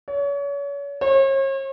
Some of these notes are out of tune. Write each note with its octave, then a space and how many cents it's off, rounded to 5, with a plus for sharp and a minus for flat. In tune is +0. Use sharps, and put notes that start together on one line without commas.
C#5 +35
C#5 -40